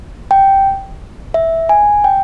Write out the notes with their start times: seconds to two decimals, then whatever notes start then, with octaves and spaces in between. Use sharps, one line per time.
0.31 G5
1.34 E5
1.69 G#5
2.04 G5